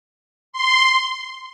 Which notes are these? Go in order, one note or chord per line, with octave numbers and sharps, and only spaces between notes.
C6